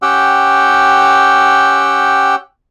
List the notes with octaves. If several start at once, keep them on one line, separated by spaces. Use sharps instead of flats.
C#4 G4 F#5 G5 E6